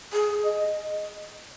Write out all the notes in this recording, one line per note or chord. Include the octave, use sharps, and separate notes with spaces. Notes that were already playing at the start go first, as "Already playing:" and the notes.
G#4
D#5